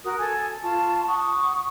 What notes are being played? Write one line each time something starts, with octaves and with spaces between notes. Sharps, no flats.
F#4 A#4 D#6
A4 G#5
F4 A5 C#6
F#5 C#6 D#6